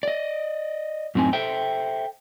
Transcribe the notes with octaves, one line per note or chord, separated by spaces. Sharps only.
D5 D#5
F#2 A2 C4 D#4 G#5
A4 C5 E5 F5 G5